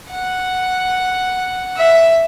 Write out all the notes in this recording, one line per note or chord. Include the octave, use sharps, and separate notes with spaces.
F#5
E5